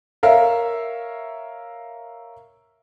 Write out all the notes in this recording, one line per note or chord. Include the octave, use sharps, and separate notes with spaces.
A#4 C#5 E5 F5